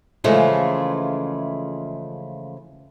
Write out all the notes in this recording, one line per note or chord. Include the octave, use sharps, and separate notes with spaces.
C#3 E3 F3 G#3 A3 F4